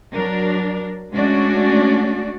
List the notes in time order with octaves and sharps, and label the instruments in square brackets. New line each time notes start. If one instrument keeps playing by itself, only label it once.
[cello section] F#3 D4 A#4
G#3 A3 C#4 D4 F#4 D5